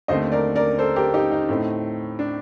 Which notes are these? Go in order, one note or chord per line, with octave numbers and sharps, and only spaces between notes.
D#2 D3 A3 C4 C5 D#5
A#4 D5
A#4 D5
A4 C5
G4 A#4
D#4 G4
D#4
A2 A3 C4
D4